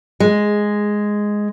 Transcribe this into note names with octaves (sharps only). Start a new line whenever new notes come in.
G#3